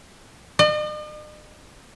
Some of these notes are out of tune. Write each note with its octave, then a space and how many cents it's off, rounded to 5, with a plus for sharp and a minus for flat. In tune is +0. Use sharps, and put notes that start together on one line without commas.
D#5 -45